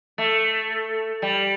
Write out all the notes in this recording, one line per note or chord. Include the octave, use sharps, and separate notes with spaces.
A3
G3